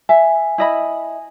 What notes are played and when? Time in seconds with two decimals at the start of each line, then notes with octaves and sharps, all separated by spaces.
0.09 E5 G#5
0.58 E4 D#5 B5